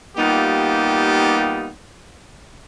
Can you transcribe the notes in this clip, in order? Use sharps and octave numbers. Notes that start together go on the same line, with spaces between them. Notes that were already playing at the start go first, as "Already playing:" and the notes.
G3 A#3 B3 D#4 F4 G4